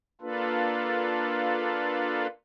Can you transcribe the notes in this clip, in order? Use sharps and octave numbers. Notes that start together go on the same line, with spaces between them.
A#3 D4 F4 A4 B4